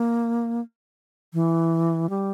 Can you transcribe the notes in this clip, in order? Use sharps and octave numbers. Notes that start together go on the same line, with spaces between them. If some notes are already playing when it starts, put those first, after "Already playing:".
Already playing: A#3
E3
G3